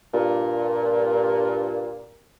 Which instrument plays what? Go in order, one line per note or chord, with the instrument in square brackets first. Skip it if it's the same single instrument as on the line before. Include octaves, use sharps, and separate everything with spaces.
[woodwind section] G2 A#2